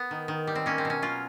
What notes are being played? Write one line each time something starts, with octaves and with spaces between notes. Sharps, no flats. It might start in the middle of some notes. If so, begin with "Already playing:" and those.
Already playing: B3
D#3
D#3
G3
C4
A#3 C#4
C4
B2 C#4
F#3 F4